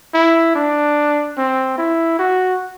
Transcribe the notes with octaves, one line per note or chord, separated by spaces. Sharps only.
E4
D4
C4
E4
F#4